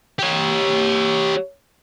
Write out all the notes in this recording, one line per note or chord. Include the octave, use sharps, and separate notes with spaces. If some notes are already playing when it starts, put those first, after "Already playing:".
G4 C#5